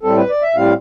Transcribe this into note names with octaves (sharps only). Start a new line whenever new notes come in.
A2 G3 C4 A4
B4
D5
E5
A2 G3 C4 F5